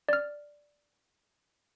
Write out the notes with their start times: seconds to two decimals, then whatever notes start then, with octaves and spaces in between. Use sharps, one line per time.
0.09 D5 F6